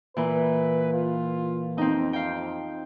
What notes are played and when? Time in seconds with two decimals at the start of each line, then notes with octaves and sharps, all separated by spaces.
0.17 A#2 E3 B4
0.93 F4
1.78 F2 C4 D#4
2.13 F5 G5